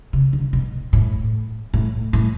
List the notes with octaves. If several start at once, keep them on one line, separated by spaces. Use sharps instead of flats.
C#3
D3
B2
A2
A2
A2